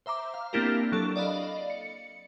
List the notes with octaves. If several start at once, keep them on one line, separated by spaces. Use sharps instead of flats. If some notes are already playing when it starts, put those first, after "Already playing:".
C5 E5 A#5 D6
F5
A#3 C4 D4 E4 G4 A#4
F#3 D4 A4
D5 D#5 F5 B5
C#7